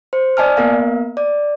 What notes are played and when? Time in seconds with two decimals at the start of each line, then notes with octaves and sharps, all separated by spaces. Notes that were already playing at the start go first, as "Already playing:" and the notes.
0.13 C5
0.37 D5 D#5 G#5 A5 F6
0.57 A#3 B3 A#4 F5
1.17 D5